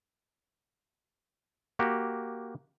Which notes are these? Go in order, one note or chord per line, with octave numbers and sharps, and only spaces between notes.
A#3 F#4 G4